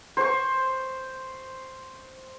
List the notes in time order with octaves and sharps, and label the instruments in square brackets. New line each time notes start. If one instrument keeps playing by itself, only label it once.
[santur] C5 C#6